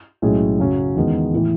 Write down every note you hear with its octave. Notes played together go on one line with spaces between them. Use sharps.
B1 A2 G#3 C#4 G#4
F#2 C#3 F#3 C#4
E2 D#3 G#3 B3
A2 E3